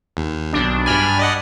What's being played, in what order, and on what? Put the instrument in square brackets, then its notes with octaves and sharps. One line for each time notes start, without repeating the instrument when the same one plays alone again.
[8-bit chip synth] D#2
[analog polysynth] B1 D4
[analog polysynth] G2 D4 B5 [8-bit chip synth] G#5 F6
[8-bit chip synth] D5 D#5 F#5